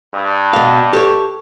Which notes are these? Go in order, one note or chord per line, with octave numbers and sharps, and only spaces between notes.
G2
B2 F5
G4 A4 C#5